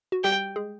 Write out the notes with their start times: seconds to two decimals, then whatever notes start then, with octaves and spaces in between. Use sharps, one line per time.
0.12 F#4
0.24 G3 G4 G5
0.56 G#3 G#4